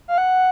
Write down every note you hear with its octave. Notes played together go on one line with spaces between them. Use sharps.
F5
F#5